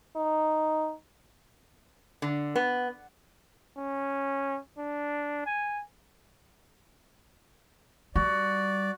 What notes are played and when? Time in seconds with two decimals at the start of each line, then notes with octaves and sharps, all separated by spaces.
0.16 D#4
2.22 D3
2.55 B3
3.77 C#4
4.78 D4
5.46 G#5
8.16 G3 F#4 D5